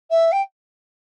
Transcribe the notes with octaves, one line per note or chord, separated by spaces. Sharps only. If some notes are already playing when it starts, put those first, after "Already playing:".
E5
G5